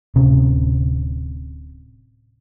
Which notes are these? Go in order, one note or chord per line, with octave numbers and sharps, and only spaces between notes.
D1 C3 C#4